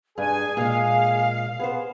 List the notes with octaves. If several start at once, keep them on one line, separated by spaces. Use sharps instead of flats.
G2 G#4 G#5
A#2 G#3 F5
B3 G#4 C5